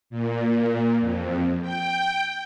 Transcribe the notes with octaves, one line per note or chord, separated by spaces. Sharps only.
A#2
F2
G5